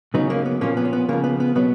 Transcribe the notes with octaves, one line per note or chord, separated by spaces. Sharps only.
C#3 F#3 B3 D#4
A#3 C#4
B3
A#2 F3 A#3 C#4
B3
C#4
B3
C#3 F3 A#3
B3
B3
B2 F#3 B3